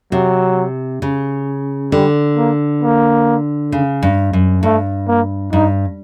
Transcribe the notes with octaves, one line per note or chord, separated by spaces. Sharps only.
C3 F#3
C#3
D3 G3
A#3
A#3
C#3
G2
F#2
G2 A3
A#3
G2 D#4